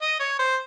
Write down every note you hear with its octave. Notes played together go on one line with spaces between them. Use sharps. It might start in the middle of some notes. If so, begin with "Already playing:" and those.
D#5
C#5
C5